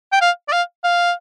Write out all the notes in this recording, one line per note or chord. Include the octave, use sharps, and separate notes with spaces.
G5
F5
D5
F5
F5